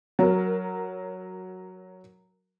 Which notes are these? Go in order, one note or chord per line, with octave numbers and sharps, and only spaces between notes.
F#3 A#4